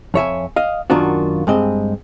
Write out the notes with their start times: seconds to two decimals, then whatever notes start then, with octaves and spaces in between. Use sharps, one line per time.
0.14 F2 C#5 E5 G#5
0.56 D#5 F5
0.90 F#2 D#3 A#3 D4 F4 F#4
1.47 G2 G#3 C4 D#5